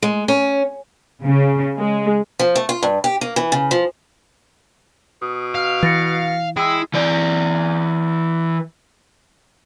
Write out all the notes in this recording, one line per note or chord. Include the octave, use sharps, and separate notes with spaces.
G#3
C#4
C#3
G#3
F3
A3
F4
G2
G4
A#3
E3
C#3
F3
B2 D#6
F#4 F5 F6
E3 A6 A#6 C#7
G#3 E4 G5 E6
E3 D5